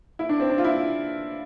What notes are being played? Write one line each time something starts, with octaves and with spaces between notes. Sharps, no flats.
E4
D4
C4
D4
F4
E4